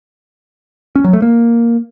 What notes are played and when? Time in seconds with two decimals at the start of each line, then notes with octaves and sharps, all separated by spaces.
0.96 C#4
1.04 F#3
1.13 A3
1.22 A#3